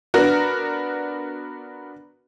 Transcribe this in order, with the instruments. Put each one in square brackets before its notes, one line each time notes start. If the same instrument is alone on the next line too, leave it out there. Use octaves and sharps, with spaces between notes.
[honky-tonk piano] B3 D4 F#4 A#4